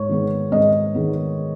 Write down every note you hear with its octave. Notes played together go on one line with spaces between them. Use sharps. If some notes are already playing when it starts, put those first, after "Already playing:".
Already playing: G#2 C#5
D#3 G#3 B3
G#2 D#5
D#3 G#3 B3